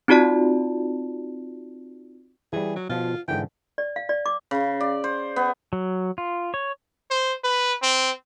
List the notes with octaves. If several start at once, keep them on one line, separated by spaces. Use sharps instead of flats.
C4 D#4 F4 F#4 D5 A5
E3 G3 G#4
F#3
B2 F3 F4
G#2 D3 E3 G5
D5
F5
D5
D6
C#3
D5
C5
B3
F#3
F4
C#5
C5
B4
C4